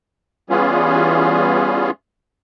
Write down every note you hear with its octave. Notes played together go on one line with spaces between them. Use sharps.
E3 G3 B3 C#4 F4 G#4